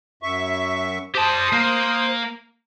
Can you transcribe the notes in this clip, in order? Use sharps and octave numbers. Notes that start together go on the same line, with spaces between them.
F#2 E5 C#6
G4 C5 A5 D#6
A#3